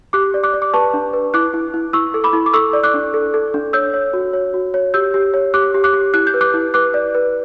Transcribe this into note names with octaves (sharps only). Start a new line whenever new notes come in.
G4 D6 F#6
D5
D6 F#6
D5
D6
B4 A5 C#6
D4
B4
E4 D6 F#6
E4
E4
E4 C#6 E6
A4
B5 D6
E4
D6
A4 C#6 E6
D5
D6 F#6
D4
A4
A4
D4
C#5 E6 G6
C#5
F#4
C#5
F#4
C#5
G4 E6 G6
G4
C#5
G4 D6 F#6
G4
D6 F#6
G4
E4 F#6
G6
B4
D6 F#6
E4
B4 D6 F#6
D5
B4